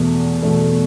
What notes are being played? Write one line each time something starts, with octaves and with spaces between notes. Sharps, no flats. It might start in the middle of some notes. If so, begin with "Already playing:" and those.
Already playing: E2 B2 A3
E2 B2 A3